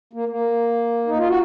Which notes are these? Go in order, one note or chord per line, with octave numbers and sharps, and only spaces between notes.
A#3
A#3
D#4
F4
F#4